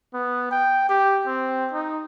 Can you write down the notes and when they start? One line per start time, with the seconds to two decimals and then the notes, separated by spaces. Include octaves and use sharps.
0.14 B3
0.51 G5
0.89 G4
1.26 C4
1.73 D#4